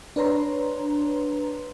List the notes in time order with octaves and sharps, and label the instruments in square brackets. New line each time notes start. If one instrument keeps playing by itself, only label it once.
[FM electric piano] D4 B4 C#5 A#5 C6